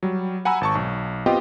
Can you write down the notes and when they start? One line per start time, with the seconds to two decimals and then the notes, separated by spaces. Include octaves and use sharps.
0.03 F#3 G3
0.45 F#5 G#5 A#5 B5 E6
0.61 G#1 A5 C#6
0.75 B1
1.26 B3 C4 F4 G4 D#5 G5